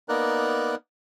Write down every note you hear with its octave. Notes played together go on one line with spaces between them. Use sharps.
A#3 B3 D#4 A#4 D5 F#6